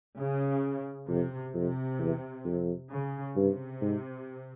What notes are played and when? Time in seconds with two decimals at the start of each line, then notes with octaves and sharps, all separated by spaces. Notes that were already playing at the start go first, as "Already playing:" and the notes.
0.18 C#3
1.08 F2 C3
1.54 F2 C3
1.99 E2
2.45 F2
2.90 C#3
3.35 G2 C3
3.81 G#2